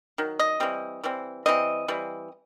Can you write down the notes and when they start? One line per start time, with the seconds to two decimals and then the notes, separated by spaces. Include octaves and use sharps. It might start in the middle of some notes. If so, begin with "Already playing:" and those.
0.18 D#3 F#3
0.39 D#5
0.60 E3 G3 C4
1.04 E3 G3 C4
1.46 E3 G3 C4 D#5
1.88 E3 G3 C4